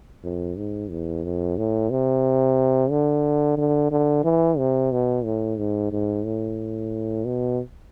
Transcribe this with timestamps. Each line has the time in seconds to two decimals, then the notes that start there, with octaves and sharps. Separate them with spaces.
0.24 F2
0.57 G#2
0.90 E2
1.24 F2
1.57 A2
1.90 C3
2.91 D3
3.57 D3
3.91 D3
4.24 E3
4.58 C3
4.92 B2
5.25 A2
5.58 G#2
5.92 G#2
6.25 A2
7.25 B2